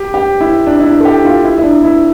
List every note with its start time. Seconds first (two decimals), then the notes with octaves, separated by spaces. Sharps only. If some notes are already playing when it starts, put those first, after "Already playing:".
Already playing: G4
0.14 G4
0.41 E4
0.67 D4
0.80 E4
0.86 D4
1.00 A4
1.05 G4
1.25 F4
1.44 E4
1.58 E4
1.64 D4
1.84 E4